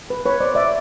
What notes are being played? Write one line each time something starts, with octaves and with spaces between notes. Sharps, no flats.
B4
B4 C#5
C5 D5
D5 E5